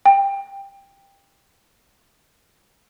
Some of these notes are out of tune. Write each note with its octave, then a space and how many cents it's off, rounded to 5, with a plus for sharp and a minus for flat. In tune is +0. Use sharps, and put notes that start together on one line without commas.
G5 +15